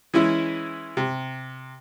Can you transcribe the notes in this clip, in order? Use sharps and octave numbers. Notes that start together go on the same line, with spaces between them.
E3 G#3 C#4 E4
C3